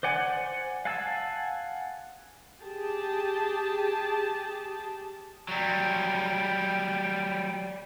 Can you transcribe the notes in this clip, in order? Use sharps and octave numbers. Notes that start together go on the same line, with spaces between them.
C5 D5 F#5 G#5
F5 F#5 G#5 A5 E6
G4 G#4 A5
F#3 G3